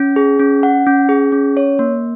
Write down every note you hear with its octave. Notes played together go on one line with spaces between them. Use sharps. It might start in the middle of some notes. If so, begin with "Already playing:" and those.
Already playing: C#4
G#4
C#4
F#5
C#4
G#4
C#4
C#5
A#3